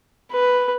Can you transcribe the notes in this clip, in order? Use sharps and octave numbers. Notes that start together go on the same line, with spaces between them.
B4